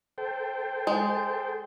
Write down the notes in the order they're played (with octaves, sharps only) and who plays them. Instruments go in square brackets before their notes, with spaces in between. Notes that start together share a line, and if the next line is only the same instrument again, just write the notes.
[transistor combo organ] A4 C5 G5
[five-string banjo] G#3